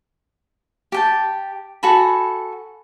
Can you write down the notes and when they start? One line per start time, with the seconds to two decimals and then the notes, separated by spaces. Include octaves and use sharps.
0.92 G4 G5 A5
1.83 F#4 A4 G#5 B5